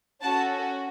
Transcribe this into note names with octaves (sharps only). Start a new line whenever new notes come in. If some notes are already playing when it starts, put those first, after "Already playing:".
C#4 F#4 A4 F#5 A5